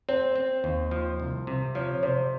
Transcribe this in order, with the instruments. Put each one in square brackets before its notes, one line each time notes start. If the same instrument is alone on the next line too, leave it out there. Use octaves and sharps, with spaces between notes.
[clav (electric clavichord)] C4 [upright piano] C5
[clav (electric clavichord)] C4
D#2
F3
C2
C3
[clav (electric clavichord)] F3 [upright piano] C#5
[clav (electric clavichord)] C3 [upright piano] C5